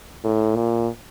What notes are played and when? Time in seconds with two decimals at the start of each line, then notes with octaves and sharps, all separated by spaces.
0.24 A2
0.56 A#2